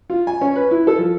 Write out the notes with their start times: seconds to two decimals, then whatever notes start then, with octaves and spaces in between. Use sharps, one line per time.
0.10 F4
0.27 G#5
0.41 C#4
0.56 B4
0.71 E4
0.87 A4
0.98 F3